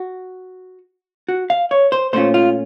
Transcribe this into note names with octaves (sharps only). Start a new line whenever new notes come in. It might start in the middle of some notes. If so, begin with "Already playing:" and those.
Already playing: F#4
F#4
F5
C#5
C5
A#2 A3 C#4 F4 C5
F4